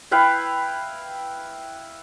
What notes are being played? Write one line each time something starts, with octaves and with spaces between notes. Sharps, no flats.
E4 B4 F5 G5